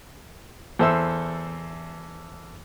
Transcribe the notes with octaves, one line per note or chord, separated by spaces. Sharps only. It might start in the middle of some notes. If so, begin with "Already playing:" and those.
E2 A4 C5 E5 E6